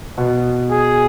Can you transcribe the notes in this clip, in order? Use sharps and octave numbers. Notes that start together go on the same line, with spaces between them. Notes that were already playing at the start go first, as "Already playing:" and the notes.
B2 B3
G#4